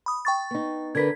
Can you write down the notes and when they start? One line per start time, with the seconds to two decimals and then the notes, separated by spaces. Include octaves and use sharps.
0.06 B5 D#6
0.25 G5 C#6 A6
0.51 B3 D#4
0.95 D3 A#4 B4 G#6 B6